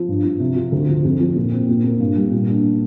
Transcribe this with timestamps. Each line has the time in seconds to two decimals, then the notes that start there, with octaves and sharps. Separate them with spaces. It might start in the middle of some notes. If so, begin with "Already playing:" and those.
Already playing: F3
0.08 G2
0.24 F3
0.40 C3
0.56 F4
0.72 D2
0.89 F3
1.04 F2
1.20 F3
1.36 A#2
1.52 C4
1.69 A#2
1.84 A#3
2.00 G2
2.17 G3
2.32 A#2
2.49 D4